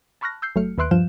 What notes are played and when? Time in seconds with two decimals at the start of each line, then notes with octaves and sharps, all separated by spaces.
0.21 A5 B5 C#6 F6 F#6 A#6
0.42 E6 G6 C7
0.55 G1 F#3 A3 F6 C#7
0.78 D#2 B4 E5 C6 F#6 D7
0.91 G2 F3 F5 G6 E7